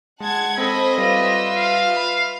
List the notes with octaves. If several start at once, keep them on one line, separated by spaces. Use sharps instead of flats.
G#3 F#5 A5 G#6
C4 A4 C5 D#5 B5
G3 F4 B4 E5
F5
B5